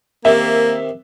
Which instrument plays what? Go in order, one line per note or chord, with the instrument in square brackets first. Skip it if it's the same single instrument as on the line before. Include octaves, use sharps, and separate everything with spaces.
[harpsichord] C3 D#3 [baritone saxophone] A#3 [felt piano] E5